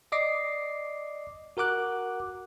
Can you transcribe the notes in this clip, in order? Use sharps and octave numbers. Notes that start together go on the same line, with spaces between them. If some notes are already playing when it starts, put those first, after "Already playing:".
D5 D#5 D6 C7
F#4 A#4 F#5 D6 F#6